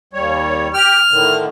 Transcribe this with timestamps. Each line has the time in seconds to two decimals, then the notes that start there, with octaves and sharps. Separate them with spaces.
0.13 D#2 G3 C#5
0.74 G4 G5 F6
1.11 A2 D3 D#3